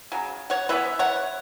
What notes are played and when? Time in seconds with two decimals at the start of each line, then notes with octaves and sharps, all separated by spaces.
0.12 C#3 F#3
0.50 C#5 F#5
0.69 E3 B3 B4 E5
0.99 C#5 F#5